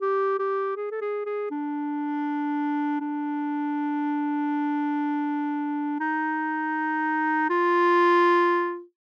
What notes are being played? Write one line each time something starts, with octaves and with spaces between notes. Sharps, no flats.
G4
G4
G#4
A4
G#4
G#4
D4
D4
D#4
F4